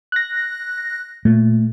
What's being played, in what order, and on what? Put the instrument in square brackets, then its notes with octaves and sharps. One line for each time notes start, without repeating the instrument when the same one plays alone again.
[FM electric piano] F#6 A#6
[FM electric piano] A#2 [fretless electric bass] A3